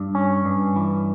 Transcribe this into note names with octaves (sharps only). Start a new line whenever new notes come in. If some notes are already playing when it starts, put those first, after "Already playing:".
Already playing: G2
C#4
G2
E3